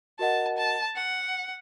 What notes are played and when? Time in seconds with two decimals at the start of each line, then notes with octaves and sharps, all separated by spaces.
0.19 F#4 A#4 D#5 F#5 A5
0.58 A5
0.97 F#5